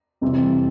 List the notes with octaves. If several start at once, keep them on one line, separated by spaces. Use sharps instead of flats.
F2 C3 E3 G3 C4